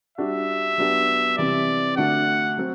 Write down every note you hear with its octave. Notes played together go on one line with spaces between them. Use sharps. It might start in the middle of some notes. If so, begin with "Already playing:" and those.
G3 D4 F#4 E5
F#3 B3 D4 G4
C3 E3 G3 D5
D3 A3 D4 F#4 F#5
F#3 C4